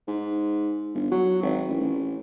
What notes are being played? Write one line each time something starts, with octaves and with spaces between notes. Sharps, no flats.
G#2
G1
F#3
G#1
A1
A1